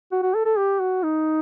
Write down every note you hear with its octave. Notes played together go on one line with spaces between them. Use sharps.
F#4
F#4
A4
A4
G4
F#4
D#4